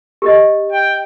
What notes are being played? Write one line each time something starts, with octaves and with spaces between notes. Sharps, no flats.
G4 D#5
G5